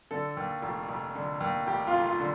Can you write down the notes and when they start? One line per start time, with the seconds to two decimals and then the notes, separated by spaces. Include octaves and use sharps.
0.11 D3 A4
0.37 D#2
0.62 F1
0.88 F1
1.15 D3
1.40 D#2
1.67 F1 G4
1.87 F4
1.94 F1
2.06 F4
2.20 D3